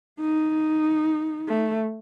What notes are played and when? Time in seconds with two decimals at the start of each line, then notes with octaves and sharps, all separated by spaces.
0.20 D#4
1.48 A3